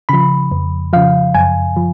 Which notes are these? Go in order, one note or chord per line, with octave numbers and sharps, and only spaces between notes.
C#3 F3 B5
F2
C#3 F3 F5
F#2 G#5
F3